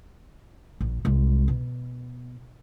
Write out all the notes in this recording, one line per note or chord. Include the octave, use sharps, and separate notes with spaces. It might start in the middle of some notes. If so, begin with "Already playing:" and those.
A#1
C2 G#3
B2